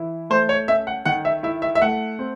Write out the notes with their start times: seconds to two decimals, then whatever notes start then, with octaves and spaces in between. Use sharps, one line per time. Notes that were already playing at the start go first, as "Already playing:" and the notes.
Already playing: E3 E4
0.30 A3 C5
0.49 C#5
0.68 C#4 E5
0.87 F#5
1.05 D#3 F#5
1.25 E5
1.43 E4 E5
1.62 E5
1.75 E5
1.82 A3 F#5
2.19 C4